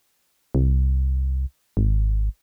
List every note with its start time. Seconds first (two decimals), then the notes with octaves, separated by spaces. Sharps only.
0.55 C2
1.77 G#1